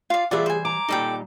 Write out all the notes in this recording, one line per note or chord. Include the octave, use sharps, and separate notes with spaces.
F4 D5 F5
E3 G3 B3 F4 G#4 D5 E5 F#5
C5 G#5
A#5 D6
A#2 G3 D#4 A4 D5 G5